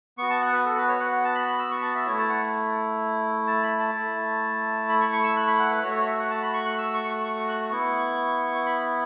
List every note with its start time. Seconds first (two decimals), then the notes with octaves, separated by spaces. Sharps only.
0.18 B3 F#4 C#6
0.30 A5
0.41 F#5
0.52 B4
0.65 A4
0.77 B4
0.88 C#5
1.00 F#5
1.12 F#5
1.24 A5
1.35 B5
1.47 B5
1.59 E6
1.71 C#6
1.82 A5
1.95 E5
2.06 A3 E4 C#5
2.18 A5
2.29 F#5
3.47 A5
3.63 B5
3.80 A5
3.94 A3 E4
4.89 B5
5.00 C#6
5.13 C#6
5.24 E6
5.37 F#6
5.47 B5
5.59 F#5
5.71 B4
5.83 A3 F#4 C#5
5.90 E5
5.95 C#5
6.07 E5
6.19 F#5
6.30 A5
6.43 B5
6.53 C#6
6.66 F#6
6.78 E6
6.94 C#6
7.08 C#6
7.25 C#6
7.37 C#6
7.48 F#6
7.71 B3 E4 C#6
8.55 C#6
8.66 B5